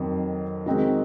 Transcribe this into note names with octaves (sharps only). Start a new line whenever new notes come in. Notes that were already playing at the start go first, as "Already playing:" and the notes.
Already playing: F2 D#3 F#3
D#3 G#3 C4 D#4 F#4